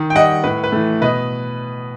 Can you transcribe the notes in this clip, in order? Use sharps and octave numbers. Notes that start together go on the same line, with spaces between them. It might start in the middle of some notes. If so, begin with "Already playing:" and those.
Already playing: D#3
G5
G3 D#5 F#5
A2 B4
B4
E3 A3
B2 B4 D#5